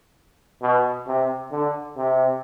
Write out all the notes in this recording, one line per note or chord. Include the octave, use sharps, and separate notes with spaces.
B2
C3
D3
C3